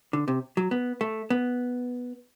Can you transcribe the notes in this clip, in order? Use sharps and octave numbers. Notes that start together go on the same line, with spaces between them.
D3
C3
F#3
B3
A3
B3